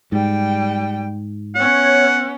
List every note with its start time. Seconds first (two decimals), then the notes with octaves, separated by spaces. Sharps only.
0.12 G#2 G3 G5
1.55 B3 C#4 C#5 F#5